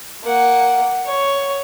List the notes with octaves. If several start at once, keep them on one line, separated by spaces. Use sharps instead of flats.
A#3 F#5
C#5